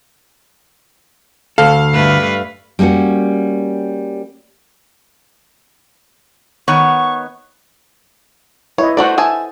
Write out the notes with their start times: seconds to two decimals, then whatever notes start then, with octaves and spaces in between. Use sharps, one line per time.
1.58 D2 A4 F5
1.93 G2 A3 B4
2.79 G3 A#3 C4 C#4 F#4
6.68 D#3 B3 C#5 C#6
8.78 E4 B4 C#5 D#5
8.97 A3 F#4 A4 C5 D5 F#5
9.18 E5 G#5 A5 D#6